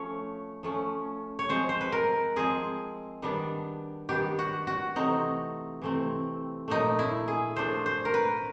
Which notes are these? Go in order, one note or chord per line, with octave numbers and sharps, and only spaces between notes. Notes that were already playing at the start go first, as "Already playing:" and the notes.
Already playing: F3 A3 C#4 C#5
F3 A3 C#4
C#5
F3 G#3 C4 C5
C5
B4
A#4
F3 G#3 C4 G#4
D#3 G3 B3 D4
D#3 G3 B3 D4 G4
F#4
F#4
C3 E3 A3 C4 D#4
C3 E3 A3 C4
A#2 F3 A3 D4 D#4
E4
G#4
A#2 F3 A3 D4 C5
C5
A#4
B4